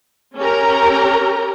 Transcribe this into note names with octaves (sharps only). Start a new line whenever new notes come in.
C#4 G4 A#4 A#5